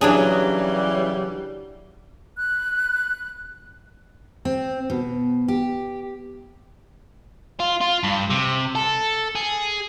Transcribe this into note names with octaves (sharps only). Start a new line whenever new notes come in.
C#3 E3 F#3 G3 D4 G#4
B5 F#6
C4
B2
G4
F4
F4
G2
C3
A4
G#4